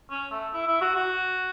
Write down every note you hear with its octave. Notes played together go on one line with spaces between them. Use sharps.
C#4
A3
E4
E4
F#4
F#4